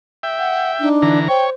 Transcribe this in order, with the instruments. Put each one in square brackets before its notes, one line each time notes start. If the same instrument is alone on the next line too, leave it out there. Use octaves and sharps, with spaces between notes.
[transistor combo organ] E5 G5
[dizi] F#5
[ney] D4 [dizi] D#4
[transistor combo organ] D3 E3 A#5
[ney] C5 [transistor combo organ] C#5 [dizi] G5